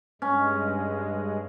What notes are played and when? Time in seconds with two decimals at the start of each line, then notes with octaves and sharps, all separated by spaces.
0.22 G2 G#3 C#4